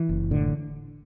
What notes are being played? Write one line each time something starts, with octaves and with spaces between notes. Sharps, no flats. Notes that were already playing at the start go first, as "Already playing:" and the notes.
Already playing: E3
F#1
A2 D3